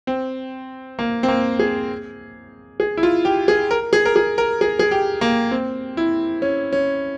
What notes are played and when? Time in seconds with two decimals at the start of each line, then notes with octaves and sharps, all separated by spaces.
0.07 C4
0.99 A#3
1.23 C4
1.28 A#3
1.59 G#4
2.80 G#4
2.97 E4
3.03 F4
3.25 G4
3.48 G#4
3.71 A#4
3.93 G#4
4.06 A#4
4.16 G#4
4.38 A#4
4.61 G#4
4.79 G#4
4.91 G4
5.21 A#3
5.51 C4
5.97 E4
6.42 C#4
6.73 C#4